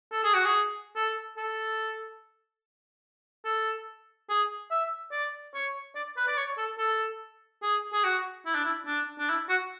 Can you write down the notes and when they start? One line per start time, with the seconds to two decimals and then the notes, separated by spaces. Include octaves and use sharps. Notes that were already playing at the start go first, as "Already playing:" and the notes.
0.12 A4
0.24 G#4
0.34 F#4
0.45 G#4
0.96 A4
1.37 A4
3.45 A4
4.29 G#4
4.71 E5
5.12 D5
5.54 C#5
5.95 D5
6.17 B4
6.28 D5
6.37 C#5
6.58 A4
6.78 A4
7.63 G#4
7.93 G#4
8.04 F#4
8.46 E4
8.55 D4
8.65 E4
8.87 D4
9.19 D4
9.29 E4
9.49 F#4